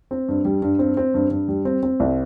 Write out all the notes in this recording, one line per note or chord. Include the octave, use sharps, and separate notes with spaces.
C4
G2
G3
G2
C4
C4
G2
G2
G3
C4
C4
C2